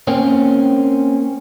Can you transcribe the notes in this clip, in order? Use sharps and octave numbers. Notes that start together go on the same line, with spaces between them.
A#3 C4 C#4